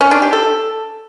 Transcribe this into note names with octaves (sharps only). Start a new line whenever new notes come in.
C#4
D4
G4
A4